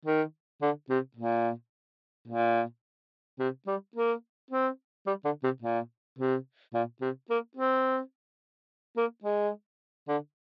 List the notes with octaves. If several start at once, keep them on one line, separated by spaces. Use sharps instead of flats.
D#3
D3
C3
A#2
A#2
C3
G3
A#3
C4
G3
D3
C3
A#2
C3
A#2
C3
A#3
C4
A#3
G#3
D3